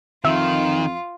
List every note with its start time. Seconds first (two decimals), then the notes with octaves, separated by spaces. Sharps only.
0.25 F2 D#3 F4 E5